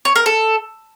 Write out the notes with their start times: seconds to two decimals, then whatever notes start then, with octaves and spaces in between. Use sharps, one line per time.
0.05 C#5
0.16 A#4
0.26 A4